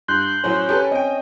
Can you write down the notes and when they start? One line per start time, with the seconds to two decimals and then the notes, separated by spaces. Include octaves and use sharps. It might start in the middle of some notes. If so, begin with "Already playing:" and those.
0.08 G2 C6 F#6 G6
0.44 A2 F#3 C#4 C5
0.69 G4 A4 B4
0.92 C4 D#5 G5